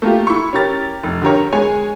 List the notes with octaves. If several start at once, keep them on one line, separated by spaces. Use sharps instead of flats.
A3 A#3 F4 G4
E4 C#6
C#4 G4 A#4 A6
F1
D3 G4 A#4 C#5
G#3 C#5 G#5